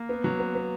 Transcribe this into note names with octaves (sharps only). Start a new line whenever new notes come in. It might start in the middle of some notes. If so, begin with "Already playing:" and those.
Already playing: A#3
B3
F#3
B3
B3